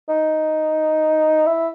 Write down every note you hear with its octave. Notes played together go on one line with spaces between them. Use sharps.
D#4
E4